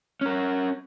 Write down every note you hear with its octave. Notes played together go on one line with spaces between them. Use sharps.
C#4 A#4